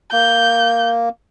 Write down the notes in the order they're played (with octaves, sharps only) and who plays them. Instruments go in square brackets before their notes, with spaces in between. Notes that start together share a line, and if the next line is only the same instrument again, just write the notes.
[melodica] A#3 [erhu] G6